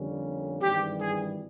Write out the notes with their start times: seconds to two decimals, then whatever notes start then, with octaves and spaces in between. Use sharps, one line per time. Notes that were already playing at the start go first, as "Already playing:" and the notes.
Already playing: F2 D3 G3 A#3 C#4
0.61 G#1 G2 E3 G3 G4
1.00 G#4